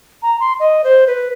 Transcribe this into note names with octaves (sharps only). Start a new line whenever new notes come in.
A#5
C6
D#5
C5
B4